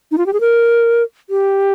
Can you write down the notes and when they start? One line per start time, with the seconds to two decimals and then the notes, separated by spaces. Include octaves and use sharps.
0.12 D#4
0.18 F4
0.26 G4
0.33 G#4
0.41 A#4
1.30 G4